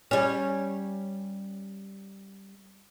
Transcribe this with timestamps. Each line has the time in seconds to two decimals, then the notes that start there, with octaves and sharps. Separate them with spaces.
0.11 G3 C#4